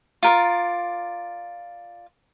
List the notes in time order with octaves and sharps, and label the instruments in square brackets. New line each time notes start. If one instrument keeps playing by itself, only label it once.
[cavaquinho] F4 A#4 D5